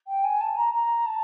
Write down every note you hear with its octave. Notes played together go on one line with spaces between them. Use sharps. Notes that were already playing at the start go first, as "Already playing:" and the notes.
G5
G#5
A5
A#5
A#5
A5